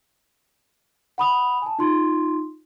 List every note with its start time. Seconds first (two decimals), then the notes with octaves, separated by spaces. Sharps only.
1.18 F#5 B5 D#6 F7
1.62 G#5 A5
1.79 D#4 F4 C6